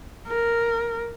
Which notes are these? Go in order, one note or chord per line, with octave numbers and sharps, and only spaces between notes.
A#4